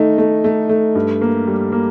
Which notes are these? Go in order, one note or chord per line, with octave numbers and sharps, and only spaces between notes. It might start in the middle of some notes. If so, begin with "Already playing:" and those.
Already playing: D#3 A3 D#4
A3
A3
A3
G2
A#3
G3
A#3